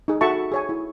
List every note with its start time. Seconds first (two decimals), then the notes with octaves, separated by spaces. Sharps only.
0.08 D#4 G#4
0.21 F#4 A4 E5 A5 B5 C#6
0.52 G#4 C#5 G#5
0.69 E4